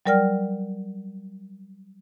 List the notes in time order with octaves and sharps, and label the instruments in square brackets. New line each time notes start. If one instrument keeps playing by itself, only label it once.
[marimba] F#3 G3 A#4 D5 G5 F6